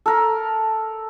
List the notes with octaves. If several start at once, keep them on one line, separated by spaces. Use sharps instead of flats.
A4 A#4